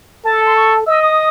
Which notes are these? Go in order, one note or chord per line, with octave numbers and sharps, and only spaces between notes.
A4 A5
C6
C#6
D#5 E6
D#6